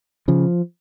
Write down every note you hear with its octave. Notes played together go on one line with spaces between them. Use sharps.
C#3 F3